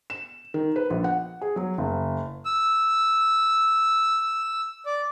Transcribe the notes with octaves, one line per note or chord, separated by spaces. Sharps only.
E7
D#3
B4
A#1
F#5
G#4
F#3
F#1
E6
D5